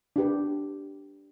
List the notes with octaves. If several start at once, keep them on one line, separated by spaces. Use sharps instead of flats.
D4 G4 B4